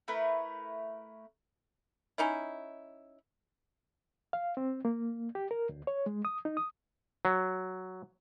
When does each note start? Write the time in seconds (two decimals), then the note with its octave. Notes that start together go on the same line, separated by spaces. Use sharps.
0.08 A3 E4 A#4 B4
2.18 C#4 D#4 E4
4.33 F5
4.57 C4
4.85 A#3
5.35 G4
5.51 A#4
5.69 D2
5.87 C#5
6.06 G#3
6.25 D#6
6.45 D#4
6.57 D#6
7.25 F#3